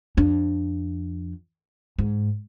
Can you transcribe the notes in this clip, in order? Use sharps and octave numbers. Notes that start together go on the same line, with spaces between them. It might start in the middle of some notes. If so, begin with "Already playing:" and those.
F2 D4
G#2